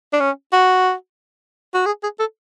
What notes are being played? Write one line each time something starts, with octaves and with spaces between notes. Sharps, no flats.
D4
C#4
F#4
F#4
G#4
G#4
A4